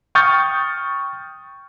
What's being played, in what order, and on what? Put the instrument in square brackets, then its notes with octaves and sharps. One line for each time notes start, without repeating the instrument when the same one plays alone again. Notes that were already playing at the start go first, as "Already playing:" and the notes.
[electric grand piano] G5 C#6 D#6 F6 G6 A6